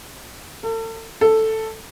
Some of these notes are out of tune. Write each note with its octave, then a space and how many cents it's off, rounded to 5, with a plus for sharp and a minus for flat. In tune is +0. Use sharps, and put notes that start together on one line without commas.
A4 +40
A4 +5